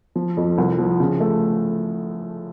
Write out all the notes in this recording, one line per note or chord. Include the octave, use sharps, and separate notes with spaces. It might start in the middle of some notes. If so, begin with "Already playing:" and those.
F3
F2
C2
F3
C#3
A3